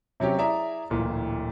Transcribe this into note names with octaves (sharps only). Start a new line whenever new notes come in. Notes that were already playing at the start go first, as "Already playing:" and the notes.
C3 F#3 C#4 G4
E4 G#4 D5 E5 A#5
D1 A#2 E3